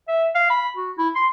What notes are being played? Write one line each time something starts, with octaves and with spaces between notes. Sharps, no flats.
E5
F5
B5
F#4
E4
C6